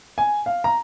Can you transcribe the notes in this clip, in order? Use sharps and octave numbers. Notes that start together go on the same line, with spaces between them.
G#5
F5
A#5